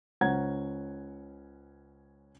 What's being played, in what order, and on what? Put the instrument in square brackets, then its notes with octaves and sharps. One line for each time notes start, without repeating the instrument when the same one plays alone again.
[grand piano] C#2 C#4 C5 F#5 A#5 G#6